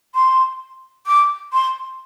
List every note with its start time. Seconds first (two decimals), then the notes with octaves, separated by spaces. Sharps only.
0.14 C6
1.06 D6
1.52 C6